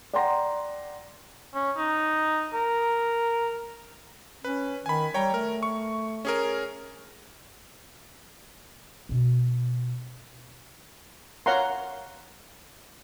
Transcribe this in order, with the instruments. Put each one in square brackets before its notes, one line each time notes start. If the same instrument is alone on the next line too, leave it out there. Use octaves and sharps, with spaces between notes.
[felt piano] D5 F#5 G5 A#5 C6 A#6
[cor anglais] C#4
D#4
A#4
[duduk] C#4 [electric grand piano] B4
[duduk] D#3 [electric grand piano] G#5 B5
[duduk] G3 [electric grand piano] C#5 G5 A#5
[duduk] A3 [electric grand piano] A#4
[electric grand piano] C#6
C#4 G#4 A#4
[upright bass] B2 C#4
[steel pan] C#5 F5 F#5 A#5 C6